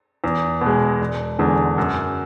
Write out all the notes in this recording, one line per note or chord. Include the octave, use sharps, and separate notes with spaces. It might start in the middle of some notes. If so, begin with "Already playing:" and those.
E2
B2
G#3
E1
E2 D3 G#3
F#2